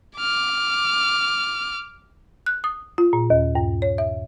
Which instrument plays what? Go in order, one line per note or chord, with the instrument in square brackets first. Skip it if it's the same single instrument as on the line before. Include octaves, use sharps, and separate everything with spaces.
[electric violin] D6 F6
[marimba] F#6
D#6
F4
A#2
D#2
G2
C#5
E5